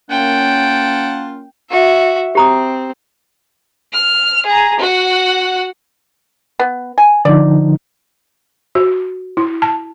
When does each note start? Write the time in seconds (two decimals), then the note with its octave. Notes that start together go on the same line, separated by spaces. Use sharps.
0.11 A#3 C#4 F4 F#5 G5 A5
1.70 F#4 E5
2.35 C4 G4 A#5 D#6
3.93 F6
4.46 G#4 A#5
4.80 F#4 F#5
6.59 B3
6.98 G#5
7.25 D3 F3 D#4 D5
8.75 F#4
9.37 E4
9.62 A5